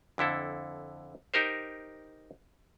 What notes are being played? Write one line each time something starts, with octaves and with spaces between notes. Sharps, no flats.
F2 D3 E4 A4
D#4 G4 A#4 C5